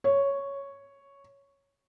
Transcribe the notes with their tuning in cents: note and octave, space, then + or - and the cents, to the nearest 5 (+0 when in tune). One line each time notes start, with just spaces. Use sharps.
C#5 +0